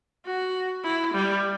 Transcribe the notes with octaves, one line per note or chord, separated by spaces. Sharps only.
F#4
E4
G3